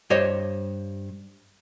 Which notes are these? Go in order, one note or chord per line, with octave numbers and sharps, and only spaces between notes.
G2 G4 C5 C#5 D#5